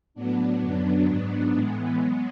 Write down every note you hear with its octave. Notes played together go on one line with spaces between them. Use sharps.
A2 F#3 B3 D4
F#2 D3 F#3
G#2 F#3
A2 E3 G#3 B3
F#3